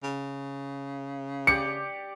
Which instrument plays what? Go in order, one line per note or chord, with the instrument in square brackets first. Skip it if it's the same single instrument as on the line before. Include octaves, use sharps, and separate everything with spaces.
[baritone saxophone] C#3
[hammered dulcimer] G4 D5 [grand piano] C#7